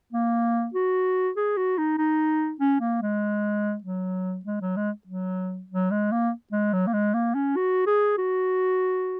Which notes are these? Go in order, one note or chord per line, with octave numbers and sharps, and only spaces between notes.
A#3
F#4
G#4
F#4
D#4
D#4
C#4
A#3
G#3
F#3
G#3
F#3
G#3
F#3
F#3
G#3
A#3
G#3
F#3
A#3
G#3
A#3
C#4
F#4
G#4
F#4